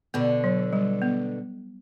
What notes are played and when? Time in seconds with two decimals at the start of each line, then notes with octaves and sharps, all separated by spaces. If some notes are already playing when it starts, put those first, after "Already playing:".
0.14 B2 D3 B3
0.44 F#3
0.73 G3
1.02 B3